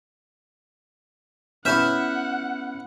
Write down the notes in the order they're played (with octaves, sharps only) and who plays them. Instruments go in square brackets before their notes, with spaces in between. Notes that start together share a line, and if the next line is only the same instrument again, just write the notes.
[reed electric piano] B3 C#4 [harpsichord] E4 E5 [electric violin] F#5 [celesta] F6 G6 E7